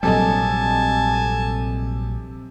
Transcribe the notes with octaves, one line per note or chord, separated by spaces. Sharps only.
A#1 C3 F#3 G3 A4 D#5 G#5 A5